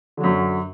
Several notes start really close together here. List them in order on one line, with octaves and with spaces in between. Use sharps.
D3 F#3 F#2